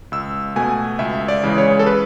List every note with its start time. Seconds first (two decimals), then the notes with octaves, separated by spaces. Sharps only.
0.12 C#2 E6
0.56 B2 A3 G#5
0.99 C#2 E5
1.28 D5
1.44 C#3 E3 G#3
1.58 C#5
1.79 A4
1.86 B4